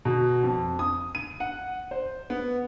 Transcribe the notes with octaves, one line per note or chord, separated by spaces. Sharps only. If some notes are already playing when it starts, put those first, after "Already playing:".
B2
F2
D#6
D#7
F#5
C5
B3